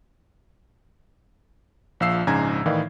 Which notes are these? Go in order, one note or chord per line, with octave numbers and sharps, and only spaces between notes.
A#1 F3 F5 E6 C7
A#1 G#2 C#3 G#5 A#5 G#6
A2 D#3 E3 D#4 D5 F5